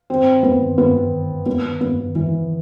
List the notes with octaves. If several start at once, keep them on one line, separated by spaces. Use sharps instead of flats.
C4
B3
B3
B3
B3
E3